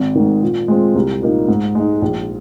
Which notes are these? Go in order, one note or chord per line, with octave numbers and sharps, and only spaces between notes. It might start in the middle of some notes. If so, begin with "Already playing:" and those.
Already playing: G#1
G#2 D#3
A#2
G#3 C4 F4
C2
A#2 A#3 D#4
G#2
G#3 D#4
A#1